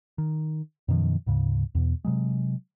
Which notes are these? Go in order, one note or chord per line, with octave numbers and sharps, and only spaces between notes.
D#3
F#2 B2 D#3 F3
D2 G#2 C#3
E2 B2
C3 F#3 G#3